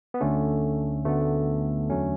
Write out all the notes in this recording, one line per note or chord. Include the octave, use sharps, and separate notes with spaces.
B3
D2 D3 A3 C#4
D2 D3 A3 B3
E2 D3 F#3 A3 C#4